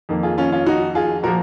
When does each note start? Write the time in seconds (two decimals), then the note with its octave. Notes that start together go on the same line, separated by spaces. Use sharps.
0.09 F2 D#3 A#3
0.23 F4 G#4
0.38 C#4 F4
0.52 C#4 F4
0.66 D#4 F#4
0.95 F4 G#4
1.23 A#2 F3 A#3 F#4 A#4